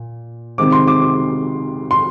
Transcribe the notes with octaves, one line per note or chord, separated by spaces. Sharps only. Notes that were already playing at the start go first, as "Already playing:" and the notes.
Already playing: A#2
C3 D#3 G#3 C4 D6
C6
D6
D6
C6